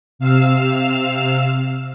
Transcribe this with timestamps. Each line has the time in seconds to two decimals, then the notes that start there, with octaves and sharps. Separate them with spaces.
0.19 C3 F5 E6 F6